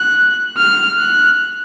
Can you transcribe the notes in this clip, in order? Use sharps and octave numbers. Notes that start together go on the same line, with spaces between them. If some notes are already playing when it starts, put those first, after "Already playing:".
Already playing: F#6
F6
F#6